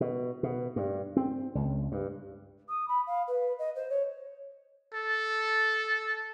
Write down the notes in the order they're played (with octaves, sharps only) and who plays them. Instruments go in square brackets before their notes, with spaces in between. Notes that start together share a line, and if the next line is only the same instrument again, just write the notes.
[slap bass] B2
B2
G2
C4
C#2
G2
[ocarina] D#6
B5
F5
B4
D#5
C5
C#5
[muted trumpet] A4